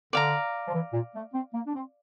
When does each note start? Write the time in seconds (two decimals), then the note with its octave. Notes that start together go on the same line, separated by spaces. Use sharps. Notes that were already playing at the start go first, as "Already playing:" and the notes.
0.13 D3 D5 F5 A#5
0.67 F3
0.74 E3
0.93 A#2
1.15 A3
1.34 C4
1.54 A#3
1.66 D4
1.74 C4